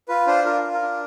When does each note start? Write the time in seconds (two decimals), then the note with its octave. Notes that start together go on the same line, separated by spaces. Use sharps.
0.08 F4 B4
0.27 D4 C5
0.45 F4 A#4
0.64 F4
0.73 A#4
0.82 D4